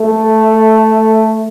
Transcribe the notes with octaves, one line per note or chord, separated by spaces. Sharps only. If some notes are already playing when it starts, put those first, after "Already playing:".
Already playing: A3